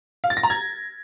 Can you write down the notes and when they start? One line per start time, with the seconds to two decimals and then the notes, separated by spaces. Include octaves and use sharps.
0.24 F5
0.30 A6
0.37 A#6
0.43 A#5
0.50 G#6